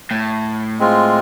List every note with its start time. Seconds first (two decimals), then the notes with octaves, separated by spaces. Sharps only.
0.11 A2
0.79 G#3 C4 F4